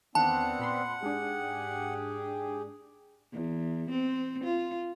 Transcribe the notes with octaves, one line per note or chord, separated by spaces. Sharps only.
E2 D#3 B3 C4 D4 F#5 A5
A#2 B5 C6
G#2 D4 G4 G#4
E2
C4
F4